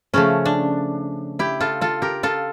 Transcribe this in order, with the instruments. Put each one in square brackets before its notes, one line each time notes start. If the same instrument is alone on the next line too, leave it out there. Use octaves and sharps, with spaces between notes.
[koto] C#3 F3 A3 C#4
D4
E4 G4
F4 A4
F4 A4
G4 A#4
F4 A4